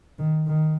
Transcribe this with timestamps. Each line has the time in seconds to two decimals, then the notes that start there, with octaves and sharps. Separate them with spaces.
0.19 D#3
0.48 D#3